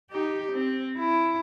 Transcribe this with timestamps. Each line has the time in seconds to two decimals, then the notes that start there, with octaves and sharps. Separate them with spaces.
0.10 D#4 G4
0.52 C4
0.98 E4